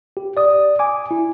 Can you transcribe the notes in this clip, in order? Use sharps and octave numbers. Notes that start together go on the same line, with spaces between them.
G4
D5 D#6
G#5 D6
E4